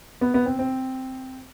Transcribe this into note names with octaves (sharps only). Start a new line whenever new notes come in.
B3
B3
C4
C4